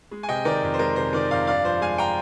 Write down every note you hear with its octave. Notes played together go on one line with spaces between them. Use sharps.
G#3
G#5
C3 D#5 G5
D#3 A#4 D5
F2
C5
G#3 A#4
C3 C5
D#3 A#4 D5
F2 D5 F5
G2 D5 F5
F3 C5
G#3 F5 G#5
G5 A#5